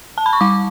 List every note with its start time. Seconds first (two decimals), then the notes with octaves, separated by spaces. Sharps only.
0.18 A5
0.26 B5
0.33 C#6
0.41 G3 D6